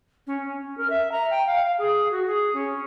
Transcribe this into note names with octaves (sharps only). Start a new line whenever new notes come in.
C#4
C#4
A#4
E5
A#5
G5
F5
G#4
F#4
G#4
C#4